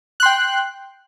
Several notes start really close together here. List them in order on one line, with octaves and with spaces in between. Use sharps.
F#6 C6 G5